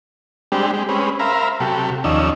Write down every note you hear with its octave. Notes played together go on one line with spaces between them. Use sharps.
G3 G#3 C4 D4 G4
G#3 G4
G#3 C4 C#4 B4
A#4 C5 E5 F5 A#5 B5
C3 F#3 G4 A4
D#2 F3 C#4 D#4 D5 E6